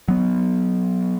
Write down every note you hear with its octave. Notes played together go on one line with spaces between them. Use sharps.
F#3 B3